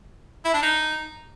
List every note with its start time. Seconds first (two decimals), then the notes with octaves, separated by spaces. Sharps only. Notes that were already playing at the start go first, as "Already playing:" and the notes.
0.45 E4
0.54 D4
0.63 D#4